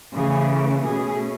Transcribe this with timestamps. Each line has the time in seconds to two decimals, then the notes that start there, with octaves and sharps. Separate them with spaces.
0.14 C#3 E3 A3 C#4 G#4
0.85 B2 A3 C#4 G#4